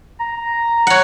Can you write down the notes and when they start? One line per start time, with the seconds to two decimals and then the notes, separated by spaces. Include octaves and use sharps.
0.20 A#5
0.87 C#5 F#5